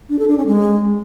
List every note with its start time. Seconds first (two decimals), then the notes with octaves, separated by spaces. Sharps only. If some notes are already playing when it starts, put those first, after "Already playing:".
0.09 D4
0.19 A4
0.28 D4
0.37 C#4
0.47 G#3